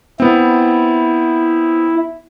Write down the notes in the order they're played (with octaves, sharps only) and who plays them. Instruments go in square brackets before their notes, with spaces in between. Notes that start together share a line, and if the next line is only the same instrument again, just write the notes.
[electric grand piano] B3 C4 [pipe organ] E4